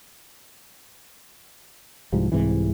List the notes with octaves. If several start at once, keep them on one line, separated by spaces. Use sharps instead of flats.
C2 G#2 F3 G3
C2 G#2 C3 E3